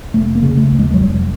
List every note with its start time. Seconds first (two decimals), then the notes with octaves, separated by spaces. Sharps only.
0.14 F1 A3
0.35 A#3
0.43 C#3
0.57 A3
0.72 D#2
0.79 G#3
0.94 F#3
1.01 F1 G3